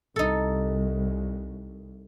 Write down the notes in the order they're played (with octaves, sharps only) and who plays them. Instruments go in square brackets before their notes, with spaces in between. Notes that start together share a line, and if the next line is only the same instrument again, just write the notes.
[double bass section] C2 [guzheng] D#4 A4